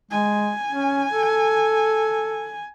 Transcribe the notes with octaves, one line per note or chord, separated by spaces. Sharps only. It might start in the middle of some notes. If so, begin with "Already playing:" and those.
G#3 G#5
C#4
A4